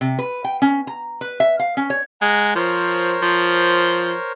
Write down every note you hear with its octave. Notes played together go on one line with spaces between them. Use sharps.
C3
B4
G5
C#4
A#5
B4
E5
F5
C#4
C#5
G#3 F#5 A#5
F3 A#4 C5 C#5
F3